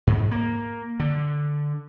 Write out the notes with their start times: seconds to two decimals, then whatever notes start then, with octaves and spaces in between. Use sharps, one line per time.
0.07 G#2
0.31 A#3
1.00 D3